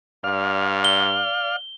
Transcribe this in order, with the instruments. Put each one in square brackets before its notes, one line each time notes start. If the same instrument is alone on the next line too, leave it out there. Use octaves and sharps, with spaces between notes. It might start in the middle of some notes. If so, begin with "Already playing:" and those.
[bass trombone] G2 [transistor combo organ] D5 F5 F6
[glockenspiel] G7